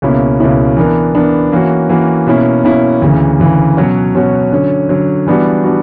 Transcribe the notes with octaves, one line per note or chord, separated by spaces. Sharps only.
C#2 B2 A#3 C#4 E4
C#2 B2 A#3 C#4 E4
E3 B3 D4 A#4
E3 B3 D4 A#4
E3 A#3 C#4 F#4
E3 A#3 C#4 F#4
B2 A#3 C#4 E4
B2 A#3 C#4 E4
D2 C#3 E3
D2 C#3 E3
B2 F#3 C#4 F#4
B2 F#3 C#4 F#4
D3 F#3 C#4
D3 F#3 C#4
E3 G3 B3 D4 F#4
G3 B3 D4 F#4